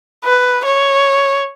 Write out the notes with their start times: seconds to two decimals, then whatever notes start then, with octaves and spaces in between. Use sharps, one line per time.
0.24 B4
0.65 C#5